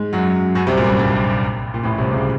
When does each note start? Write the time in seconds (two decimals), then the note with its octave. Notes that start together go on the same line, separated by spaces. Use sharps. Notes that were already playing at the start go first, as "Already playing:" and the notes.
Already playing: G#2 G#3
0.13 F#2 F#3
0.55 F#2 F#3
0.67 C2 C3
0.77 A#1 A#2
0.88 G2
0.99 G2
1.74 A#2
1.83 A1 A2
1.98 C2 C3
2.13 C#2 C#3